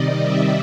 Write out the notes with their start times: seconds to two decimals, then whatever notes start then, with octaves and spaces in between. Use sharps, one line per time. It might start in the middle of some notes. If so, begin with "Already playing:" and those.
Already playing: C3 D#3 G3 D5 D#5
0.23 E5